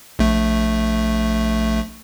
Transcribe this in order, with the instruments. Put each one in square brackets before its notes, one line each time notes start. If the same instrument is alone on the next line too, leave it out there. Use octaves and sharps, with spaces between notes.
[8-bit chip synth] A#1 A3